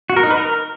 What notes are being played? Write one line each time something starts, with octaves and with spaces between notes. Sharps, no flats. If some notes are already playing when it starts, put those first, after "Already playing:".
F#4
A#4
D#4
B4
A#4